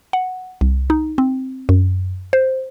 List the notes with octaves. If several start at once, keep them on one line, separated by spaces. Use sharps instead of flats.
F#5
C2
D#4
C4
F#2
C5